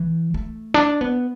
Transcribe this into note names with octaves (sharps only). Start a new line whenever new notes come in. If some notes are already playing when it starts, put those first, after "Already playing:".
Already playing: E3
A3
D4
B3